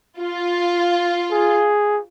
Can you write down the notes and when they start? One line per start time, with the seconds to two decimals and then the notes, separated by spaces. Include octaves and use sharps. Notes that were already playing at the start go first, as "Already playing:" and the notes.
0.18 F4
1.31 G#4